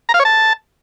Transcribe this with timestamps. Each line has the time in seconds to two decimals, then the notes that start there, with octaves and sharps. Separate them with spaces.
0.09 A#5
0.14 F5
0.20 C#5
0.25 A5